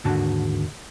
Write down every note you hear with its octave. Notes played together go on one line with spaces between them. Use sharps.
D#2 G#2 D3 F#4 A5